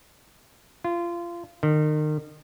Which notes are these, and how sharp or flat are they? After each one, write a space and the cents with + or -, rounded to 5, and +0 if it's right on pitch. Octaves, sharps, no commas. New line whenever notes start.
F4 -25
D#3 -35